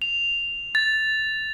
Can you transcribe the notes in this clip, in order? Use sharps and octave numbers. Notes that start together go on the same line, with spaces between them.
F7
A6